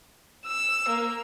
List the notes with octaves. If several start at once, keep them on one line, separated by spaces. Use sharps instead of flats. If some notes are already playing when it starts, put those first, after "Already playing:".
E6
A#3